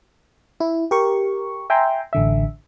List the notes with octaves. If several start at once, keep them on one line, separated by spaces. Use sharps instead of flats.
E4
G4 A#4 C#6
E5 G5 G#5 A#5 C6
A1 D3 E5